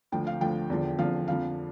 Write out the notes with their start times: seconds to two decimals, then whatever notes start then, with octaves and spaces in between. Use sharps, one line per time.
0.12 D2 D3 F3 G5
0.27 F5
0.41 D2 D3 F3 G5
0.70 E2 D3 F3
0.98 E2 D3 F3 F5
1.27 F2 D3 F3 F5